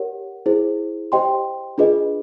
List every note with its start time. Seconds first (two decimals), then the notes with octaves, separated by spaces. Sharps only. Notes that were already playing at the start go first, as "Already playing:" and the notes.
Already playing: G4 A#4 C#5 F#5
0.46 E4 G#4 C5
1.12 G4 C5 D#5 G5 C6
1.78 D4 F4 G#4 B4 D#5